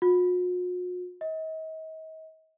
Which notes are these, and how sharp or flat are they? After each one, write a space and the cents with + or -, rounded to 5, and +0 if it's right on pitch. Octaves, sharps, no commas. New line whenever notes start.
F#4 -45
D#5 +40